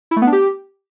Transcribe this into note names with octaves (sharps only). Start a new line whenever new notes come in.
E4
A3
B3
D4
G4